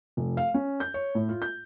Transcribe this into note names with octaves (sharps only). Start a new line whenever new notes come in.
F1
F5
C#4
G6
C#5
A2
F4
G6